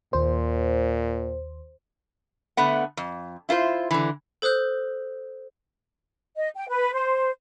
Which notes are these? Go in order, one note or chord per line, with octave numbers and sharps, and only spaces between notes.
D#2 A#2 C5
D3 A3 B3 F#5
F2
E4 F4 A#4 C5
D3 E3
A4 C5 D#6 F#6 G6
D#5
G5
B4
C5